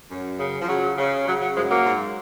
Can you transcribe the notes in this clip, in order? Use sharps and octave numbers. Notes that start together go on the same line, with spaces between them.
F#2
C#3
F3
C#3 F#3
C#3
C#3 F#3
F#3
F#2 F3 G#3
F#3 A#3
G#2